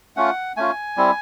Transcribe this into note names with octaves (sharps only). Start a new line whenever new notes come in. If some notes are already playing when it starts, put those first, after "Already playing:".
A3 C#4 F4 F#5
A3 C#4 F4 G#5
G3 C4 E4